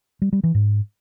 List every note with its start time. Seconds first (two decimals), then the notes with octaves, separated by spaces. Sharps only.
0.22 G3
0.33 G3
0.44 E3
0.55 G#2